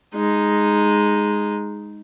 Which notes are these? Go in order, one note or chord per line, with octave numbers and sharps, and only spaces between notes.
G#3 D#4